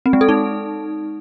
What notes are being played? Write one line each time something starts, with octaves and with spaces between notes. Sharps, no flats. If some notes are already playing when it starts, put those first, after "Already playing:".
C4
G#3
A4
D#4